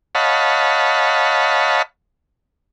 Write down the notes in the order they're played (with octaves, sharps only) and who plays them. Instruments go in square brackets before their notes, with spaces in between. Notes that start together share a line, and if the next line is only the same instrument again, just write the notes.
[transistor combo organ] C#5 D#5 F5 F#5 A5 B5